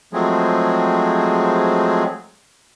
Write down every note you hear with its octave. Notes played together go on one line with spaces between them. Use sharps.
F3 F#3 G#3 A3 C4 G#4